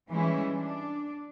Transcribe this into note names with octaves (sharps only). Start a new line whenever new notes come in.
E3 G3 G#3 C#4 E4
D4